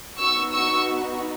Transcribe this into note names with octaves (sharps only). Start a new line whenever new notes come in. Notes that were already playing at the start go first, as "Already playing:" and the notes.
B3 D#4 F#4 C#6 E6
C#6 E6